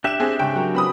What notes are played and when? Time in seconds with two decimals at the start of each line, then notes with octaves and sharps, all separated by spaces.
0.04 D4 G4 E5 F#6 E7
0.20 C4 G#4
0.39 G#2 C#3 G5
0.55 F#3 F#4 A#4
0.75 C4 E4 B4 B5 D#6